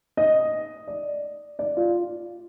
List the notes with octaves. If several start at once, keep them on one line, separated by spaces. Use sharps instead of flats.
D#5
D5
D5
F4